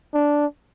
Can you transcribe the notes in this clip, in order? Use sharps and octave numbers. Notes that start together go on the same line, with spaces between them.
D4